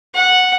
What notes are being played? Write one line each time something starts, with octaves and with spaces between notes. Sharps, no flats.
F#5